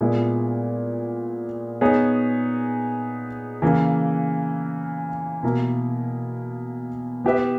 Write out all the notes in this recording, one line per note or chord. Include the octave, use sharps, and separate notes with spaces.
A#2 G#3 B3 E4
B3 D#4 G#4 C#5
C#3 E3 A#3
B2 A#3 E4 A#4
B3 E4 G4 B4 E5